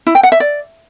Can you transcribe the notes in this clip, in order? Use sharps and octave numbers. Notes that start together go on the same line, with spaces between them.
E4
G5
F#5
E5
D5